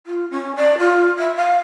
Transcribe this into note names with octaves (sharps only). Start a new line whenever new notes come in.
F4
C#4
D5
F4
E5
F5